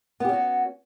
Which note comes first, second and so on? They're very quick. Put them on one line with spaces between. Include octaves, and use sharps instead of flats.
B3 G4 C#4 F#4